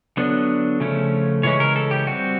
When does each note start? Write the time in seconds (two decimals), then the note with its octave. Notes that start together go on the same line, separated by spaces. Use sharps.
0.17 D3 F#3 B3 D4
0.80 C#3 F3 A3 C#4
1.43 C#3 E3 G#3 C#4 C#5
1.60 A#4
1.76 A4
1.91 G4
2.07 G3 C4 F#4